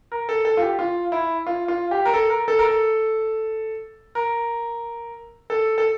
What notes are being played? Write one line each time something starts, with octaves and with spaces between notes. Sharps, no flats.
A#4
A4
A4
F4
G4
F4
E4
F4
F4
G4
A#4
A4
A#4
A4
A#4
A4
A#4
A4
A4